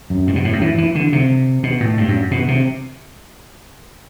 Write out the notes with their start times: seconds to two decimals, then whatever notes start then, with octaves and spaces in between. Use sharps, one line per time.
0.10 F#2
0.27 G2
0.36 B2
0.45 A2
0.53 F#2
0.61 E3
0.78 E3
0.95 D3
1.13 C3
1.63 B2
1.80 A2
1.97 G2
2.08 F#2
2.31 B2
2.48 C3